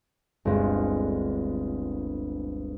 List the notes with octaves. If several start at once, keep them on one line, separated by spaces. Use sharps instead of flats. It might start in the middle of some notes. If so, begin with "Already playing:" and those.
G1 D2 G#3 C4 F4